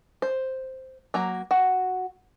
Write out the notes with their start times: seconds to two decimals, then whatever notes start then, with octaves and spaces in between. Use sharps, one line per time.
0.22 C5
1.14 F#3 A#3 A#5
1.51 F#4